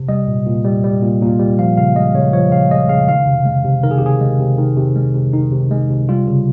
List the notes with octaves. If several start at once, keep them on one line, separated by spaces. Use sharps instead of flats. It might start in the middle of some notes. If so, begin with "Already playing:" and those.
Already playing: C3
G3 D#5
A#2
A#2
G3
G3
A#2
A#2
G3
F3 F5
C#3 F5
G#3 D#5
C#3 C#5
F3 C#5
C#3 F5
G#3 D#5
C#3 F5
D#3 F5
C3
G#3
C3
D#3 A#4
G#4
G4
C3 G#4
G#3
C3
D#3
C3
G#3
C3
D#3 D#4
C3
G#3
C3
G3 F4
C#3